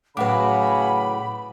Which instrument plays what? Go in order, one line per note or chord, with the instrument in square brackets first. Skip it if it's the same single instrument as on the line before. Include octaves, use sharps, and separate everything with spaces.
[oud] A2 F#3 [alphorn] C#3 [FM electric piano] B4 F#5 D6 [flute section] B5